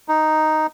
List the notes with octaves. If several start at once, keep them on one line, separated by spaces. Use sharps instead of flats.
D#4